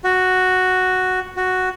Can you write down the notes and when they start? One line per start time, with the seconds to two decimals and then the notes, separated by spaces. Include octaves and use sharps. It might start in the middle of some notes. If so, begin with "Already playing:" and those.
0.04 F#4
1.36 F#4